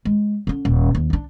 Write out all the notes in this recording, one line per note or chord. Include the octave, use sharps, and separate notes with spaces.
G#3
D3 C#4
D#1
D#2
C4 D4